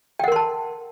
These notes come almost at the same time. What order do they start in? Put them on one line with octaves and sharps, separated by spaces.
G5 F#5 A#4 C6 A5